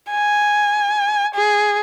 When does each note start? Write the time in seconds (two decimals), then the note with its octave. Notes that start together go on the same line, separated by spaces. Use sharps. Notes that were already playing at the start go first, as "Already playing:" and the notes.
0.10 G#5
1.35 G#4